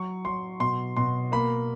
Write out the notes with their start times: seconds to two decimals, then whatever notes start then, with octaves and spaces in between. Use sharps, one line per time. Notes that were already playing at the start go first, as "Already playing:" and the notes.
Already playing: F#3 C#6
0.25 F#3 C6
0.60 B2 C6
0.96 B2 C6
1.32 A#3 B5